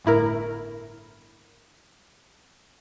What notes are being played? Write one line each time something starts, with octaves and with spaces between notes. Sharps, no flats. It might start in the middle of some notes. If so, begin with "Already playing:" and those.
G1 A2 E4 A#4